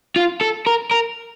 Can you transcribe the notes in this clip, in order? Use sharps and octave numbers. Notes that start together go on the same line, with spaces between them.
F4
A4
A#4
A#4